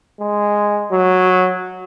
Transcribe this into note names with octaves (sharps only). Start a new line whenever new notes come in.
G#3
F#3